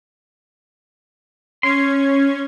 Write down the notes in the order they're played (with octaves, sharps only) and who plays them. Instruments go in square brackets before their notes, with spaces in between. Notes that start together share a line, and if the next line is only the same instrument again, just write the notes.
[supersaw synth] C#4 G#6 [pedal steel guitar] C6